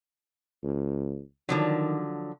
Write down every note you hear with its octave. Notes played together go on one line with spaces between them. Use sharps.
C#2
D3 D#3 F3 F#3